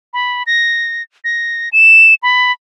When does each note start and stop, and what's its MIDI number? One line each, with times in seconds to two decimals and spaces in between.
0.14 0.43 83
0.47 1.03 94
1.24 1.69 94
1.73 2.14 100
2.23 2.52 83